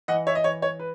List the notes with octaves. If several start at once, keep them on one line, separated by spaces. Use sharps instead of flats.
E3 D#5 F#5
C#5 E5
D#5
E3 C#5
C#5
B4